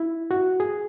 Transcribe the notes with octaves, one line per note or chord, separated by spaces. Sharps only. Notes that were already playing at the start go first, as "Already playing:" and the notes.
Already playing: E4
F#4
G#4